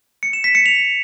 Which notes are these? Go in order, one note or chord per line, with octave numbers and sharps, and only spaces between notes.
C#7
E7
B6
C#7
F7